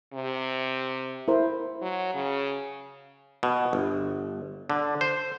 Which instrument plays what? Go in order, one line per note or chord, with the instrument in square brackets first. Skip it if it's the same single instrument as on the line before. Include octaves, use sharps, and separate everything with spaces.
[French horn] C3
[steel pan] E4 A#4 C5
[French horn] F#3
C#3
[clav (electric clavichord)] B2
G1
D3
C5